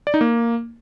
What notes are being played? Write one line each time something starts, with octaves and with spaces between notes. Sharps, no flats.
D5
D#4
A#3